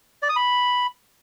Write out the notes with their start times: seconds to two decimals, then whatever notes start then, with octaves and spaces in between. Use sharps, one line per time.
0.23 D5
0.29 D#6
0.36 B5